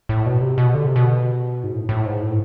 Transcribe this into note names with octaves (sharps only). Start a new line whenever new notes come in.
A2
B2
C3
B2
D3
C3
B2
G#2
A2
A2
G#2
A2